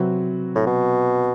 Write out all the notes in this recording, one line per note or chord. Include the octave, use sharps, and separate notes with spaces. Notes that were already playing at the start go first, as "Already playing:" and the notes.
Already playing: C3 F#3 C4 F#4 B4
A2
B2